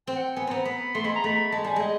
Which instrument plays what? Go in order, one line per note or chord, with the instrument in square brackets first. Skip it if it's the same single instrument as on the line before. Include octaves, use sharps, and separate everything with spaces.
[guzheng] C4 [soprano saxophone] G5
[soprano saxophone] F#5
G5
[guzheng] B3 [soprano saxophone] G#5
[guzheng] B3 C4 [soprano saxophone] A#5
[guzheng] B3 [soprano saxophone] B5
[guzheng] A3 [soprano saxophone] C6
[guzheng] G#3 [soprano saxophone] B5
[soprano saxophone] A#5
[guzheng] A3 [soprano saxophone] B5
[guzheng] G#3 [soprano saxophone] A5
[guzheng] G3 [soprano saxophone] G#5
[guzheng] G#3
[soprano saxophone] D#5